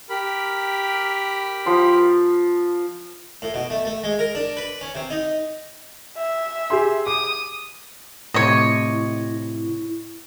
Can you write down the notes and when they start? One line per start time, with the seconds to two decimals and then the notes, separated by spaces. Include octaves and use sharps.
0.10 G4 A#4 B5
1.66 F3 C6
3.42 A2
3.54 B2
3.70 A3
3.85 A3
4.04 G#3
4.19 A#4
4.35 D4
4.57 B4
4.81 C#4
4.95 C3
5.10 D#4
6.17 E5
6.70 G4 G#4 C6
7.07 D6 D#6
8.34 A2 C3 E4 C#5 D#5